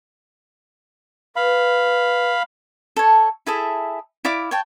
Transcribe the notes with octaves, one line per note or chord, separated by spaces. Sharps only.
B4 F5 B5
A4 C#5
E4 G#4 A4 E5
E4 D5 F5 D6
C#5 G5 A5